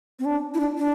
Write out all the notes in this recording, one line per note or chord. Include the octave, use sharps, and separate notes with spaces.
C4
D4
E4
D4
D4